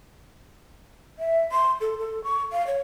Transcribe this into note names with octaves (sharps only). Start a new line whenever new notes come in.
E5
C6
A4
A4
C#6
F5
C#5